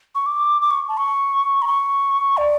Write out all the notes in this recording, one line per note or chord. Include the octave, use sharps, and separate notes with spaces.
C#6
D6
D6
C#6
A5
C#6
A#5
C#6
D5